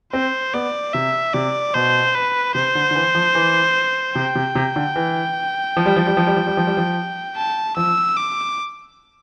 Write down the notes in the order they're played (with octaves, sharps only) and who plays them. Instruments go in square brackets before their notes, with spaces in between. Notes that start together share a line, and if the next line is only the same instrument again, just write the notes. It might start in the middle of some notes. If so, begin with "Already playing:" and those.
[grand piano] C4 [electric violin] C5
[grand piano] B3 [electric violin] D5
[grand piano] C3 [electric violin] E5
[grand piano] C3 [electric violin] D5
[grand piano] B2 [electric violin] C5
[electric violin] B4
[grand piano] C3 [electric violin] C5
[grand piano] D3
D3
E3
F3
E3
[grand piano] C3 [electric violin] G5
[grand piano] C3
C3
D3
E3
F3
G3
F3
G3
F3
G3
F3
G3
F3
G3
F3
[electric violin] A5
[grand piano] F3 [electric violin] E6
[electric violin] D6